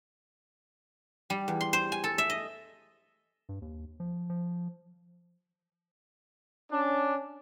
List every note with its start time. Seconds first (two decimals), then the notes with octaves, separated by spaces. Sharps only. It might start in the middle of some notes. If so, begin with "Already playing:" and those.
1.30 G3
1.48 E2
1.61 C6
1.73 C5
1.92 G#5
2.04 A4
2.18 E5
2.30 D#5
3.49 G2
3.62 D#2
4.00 F3
4.30 F3
6.72 C#4 D4